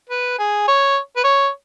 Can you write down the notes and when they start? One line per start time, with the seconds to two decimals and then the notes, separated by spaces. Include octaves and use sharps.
0.10 B4
0.39 G#4
0.68 C#5
1.16 B4
1.24 C#5